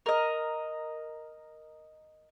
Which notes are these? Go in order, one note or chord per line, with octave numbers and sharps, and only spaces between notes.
A#4 D#5